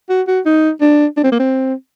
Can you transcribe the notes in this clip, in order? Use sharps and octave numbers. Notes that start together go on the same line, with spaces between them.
F#4
F#4
D#4
D4
D4
C4
A#3
C4